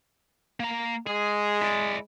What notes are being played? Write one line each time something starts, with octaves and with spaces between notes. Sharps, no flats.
A#3 A#5
G#3 G#4
E4 D5